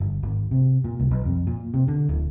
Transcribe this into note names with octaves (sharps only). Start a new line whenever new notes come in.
G1
G#1
C3
A#2
C2
B1
F2
A#2
C3
D3
D1